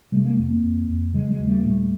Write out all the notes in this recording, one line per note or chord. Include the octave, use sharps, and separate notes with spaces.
C3 G3 A3
G#3 A#3
F2 A3 B3
A#3 C4
F2
F2
C#3 F#3 G#3
F#3 G#3
D#2
G3 A3
A#3
A#2 G3 A3